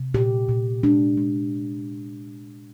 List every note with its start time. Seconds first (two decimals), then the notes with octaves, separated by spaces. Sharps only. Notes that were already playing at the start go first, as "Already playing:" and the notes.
Already playing: C3
0.14 A#2 G4
0.49 A#2
0.83 G#3 D4
1.17 G#3